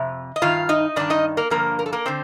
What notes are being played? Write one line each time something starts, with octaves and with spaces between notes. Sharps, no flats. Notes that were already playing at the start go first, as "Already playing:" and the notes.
Already playing: F2 C3
D#5
G2 D#3 F4 F5
D#4 D#5
G2 D#3 D4 D5
D#4 D#5
A#3 A#4
G2 D3 F3 A#3 A#4
A#4
A4
A#3 A#4
D3 C4 C5